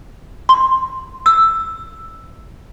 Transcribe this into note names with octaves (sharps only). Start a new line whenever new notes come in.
C6
E6